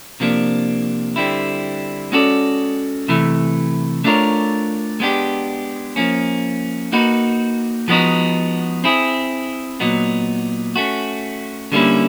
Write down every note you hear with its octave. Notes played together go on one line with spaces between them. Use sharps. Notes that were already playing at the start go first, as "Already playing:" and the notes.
C3 F3 A#3 D4
D3 G3 C4 E4
G#3 C#4 F#4 A4 D5
C3 E3 A3
A3 D4 F4 A#4 C#5
G#3 B3 D4 G4
F3 A#3 C#4
A#3 D#4 F#4 B4
F3 G#3 B3 D#4 F#4
C4 E4 G#4
A#2 F#3 B3 D#4
A3 C#4 F#4
D3 G3 A#3 C#4 E4